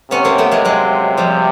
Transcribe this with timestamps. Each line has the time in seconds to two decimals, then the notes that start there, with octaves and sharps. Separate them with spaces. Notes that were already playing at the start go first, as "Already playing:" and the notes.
0.11 C3 B3 C#4
0.25 A#3 C4
0.38 A3 B3
0.52 G#3 A#3
0.65 F#3 G#3
1.17 F3 G3